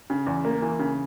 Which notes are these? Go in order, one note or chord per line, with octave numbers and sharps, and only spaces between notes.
C#3
E2
A#3
E3
C#3